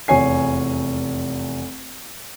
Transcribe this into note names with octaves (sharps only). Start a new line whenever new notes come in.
F1 E2 C#5 G#5 C7